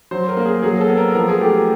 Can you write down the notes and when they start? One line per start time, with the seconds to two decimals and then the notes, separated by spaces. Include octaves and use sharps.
0.11 F#3 C5
0.28 A#4
0.37 A#3
0.45 G#4
0.62 F#3 G#4
0.81 A4
0.89 B3
0.97 A#4
1.15 F3 A#4
1.28 G#4
1.41 A3 G4